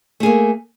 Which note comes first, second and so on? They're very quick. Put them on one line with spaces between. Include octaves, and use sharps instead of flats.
A3 G#4 A#3